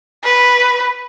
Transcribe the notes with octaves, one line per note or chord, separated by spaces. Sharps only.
B4